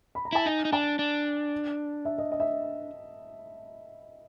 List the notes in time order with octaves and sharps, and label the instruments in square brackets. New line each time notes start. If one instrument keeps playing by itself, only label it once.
[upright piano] B5
A#5
[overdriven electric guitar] E4 [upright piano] A5
[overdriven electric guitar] D#4 [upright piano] G#5
[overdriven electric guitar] D#4
[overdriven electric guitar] D4 [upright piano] A5
[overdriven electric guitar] D4
[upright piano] E5
D#5
D#5
E5